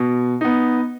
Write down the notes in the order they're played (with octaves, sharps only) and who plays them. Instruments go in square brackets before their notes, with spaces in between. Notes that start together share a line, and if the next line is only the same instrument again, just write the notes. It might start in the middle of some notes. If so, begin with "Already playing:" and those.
Already playing: [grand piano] B2
B3 D#4